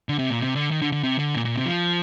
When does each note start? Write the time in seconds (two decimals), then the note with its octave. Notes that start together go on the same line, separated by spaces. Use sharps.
0.09 D3
0.19 C3
0.30 A#2
0.40 C3
0.56 D3
0.71 D#3
0.82 D3
0.92 D3
1.04 C3
1.19 D3
1.35 A#2
1.45 A#2
1.55 C3
1.66 F3